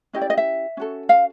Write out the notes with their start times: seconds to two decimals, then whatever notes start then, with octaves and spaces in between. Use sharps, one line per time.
0.13 C#4 E4 G4 D#5
0.21 D5
0.30 D#5
0.37 E5
0.77 C#4 F#4 A4
1.09 F5